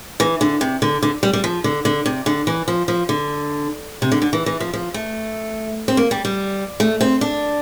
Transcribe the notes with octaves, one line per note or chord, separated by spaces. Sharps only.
E3
D3
C3
D3
D3
G3
G3
F3
D3
D3
C3
D3
E3
F3
F3
D3
C3
D3
D3
E3
E3
F3
F3
A3
C4
A#3
G3
G3
A3
C4
D4